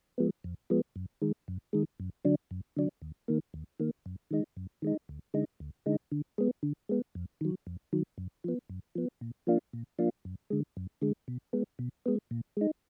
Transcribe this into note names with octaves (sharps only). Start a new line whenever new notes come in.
F3 G#3 B3
F2
F3 G#3 B3
F#2
D#3 G#3
F#2
D#3 G#3
F#2
D3 F#3 D4
F#2
D3 F#3 D4
D#2
D#3 A#3
D#2
D#3 A#3
F#2
D#3 G#3 D#4
F#2
D#3 G#3 D#4
D2
D3 G#3 D#4
D2
D3 G#3 D#4
D3
G#3 B3
D3
G#3 B3
F2
D#3 F#3
F2
D#3 F#3
F#2
F3 B3
F#2
F3 B3
A#2
F3 A#3 D4 F4
A#2
F3 A#3 D4 F4
F#2
D3 G#3
F#2
D3 G#3
B2
G#3 B3
B2
G#3 B3
A#2
G#3 D#4